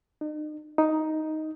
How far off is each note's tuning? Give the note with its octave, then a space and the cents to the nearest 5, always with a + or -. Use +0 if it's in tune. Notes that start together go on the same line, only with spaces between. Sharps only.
D#4 -40
D#4 +5